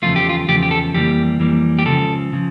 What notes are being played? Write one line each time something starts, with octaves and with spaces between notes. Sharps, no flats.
E2 C#3 F3 A3 F4
G4
F4
E2 C#3 F3 A3 G4
G4
A4
F2 E3 G3 A#3 G4
F2 E3 G3 A#3
G4
C#2 C#3 F3 A4
C#3 F3